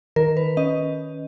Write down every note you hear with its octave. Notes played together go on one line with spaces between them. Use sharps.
D#3 A#4
B4
C#4 D#5